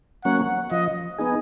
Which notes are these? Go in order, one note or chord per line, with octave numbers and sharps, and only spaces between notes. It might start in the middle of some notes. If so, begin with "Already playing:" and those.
F#3 A#3 C#4 F#5
F3 D#5
B3 D#4 G#4